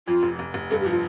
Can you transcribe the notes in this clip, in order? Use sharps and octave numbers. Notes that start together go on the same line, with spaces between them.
F2 F4
F1
F1
F1
G2 A4
G4
F3
F4